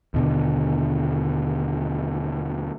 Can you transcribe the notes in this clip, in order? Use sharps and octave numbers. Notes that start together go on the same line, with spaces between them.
D#2 B2 D3